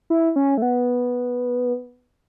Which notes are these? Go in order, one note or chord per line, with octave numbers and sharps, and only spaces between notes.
E4
C#4
A3
B3